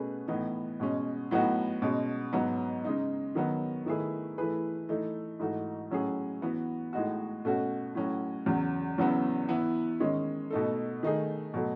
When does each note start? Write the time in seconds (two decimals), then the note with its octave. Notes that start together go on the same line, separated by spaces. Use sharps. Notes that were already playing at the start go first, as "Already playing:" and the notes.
Already playing: B2 A3 C#4 G#4 B4
0.28 A2 E3 B3 D#4
0.80 B2 G#3 C#4
1.31 A2 F#3 B3 D#4 F#4
1.82 B2 G#3 C#4
2.33 G#2 F#3 B3
2.85 C#3 G#3 D#4
3.35 D#3 F#3 B3
3.86 D#3 A3 E4 G#4 B4
4.38 E3 A3 E4 G#4 B4
4.89 E3 A3 D#4 A4
5.39 G#2 E3 A3 D#4 F#4
5.90 A2 F#3 C#4 G#4
6.42 E3 B3 F#4 B4
6.93 A2 G#3 D#4 F#4
7.45 B2 A3 C#4 F#4
7.95 A2 F#3 C#4 F#4
8.46 E2 C#3 F#3
8.98 E2 C#3 F#3 B3 E4
9.49 E3 B3 E4 B4
10.00 D#3 G#3 C#4
10.51 B2 A3 D#4 A4
11.03 D#3 A3 D#4 G#4
11.54 B2 F#3 A3